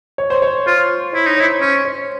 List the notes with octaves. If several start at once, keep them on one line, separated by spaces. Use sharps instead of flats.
C#5
C5
C#5
F4 C5
E4 C#5
D#4
E4 C#5
C#4 C5
C#5